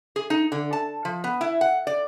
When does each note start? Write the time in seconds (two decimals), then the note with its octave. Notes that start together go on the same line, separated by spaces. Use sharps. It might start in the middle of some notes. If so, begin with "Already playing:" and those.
0.16 G#4
0.30 D#4
0.52 D3
0.73 A5
1.05 F3
1.24 B3
1.41 E4
1.61 F#5
1.87 D5